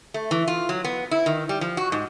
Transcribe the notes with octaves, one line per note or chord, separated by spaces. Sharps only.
A3
E3
F4
F#3
B3
E4
D#3
G3
F3
F#4
G#2